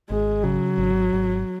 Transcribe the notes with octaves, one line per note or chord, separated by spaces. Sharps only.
G#1 G#3
C#3 F#3
G#1
G#1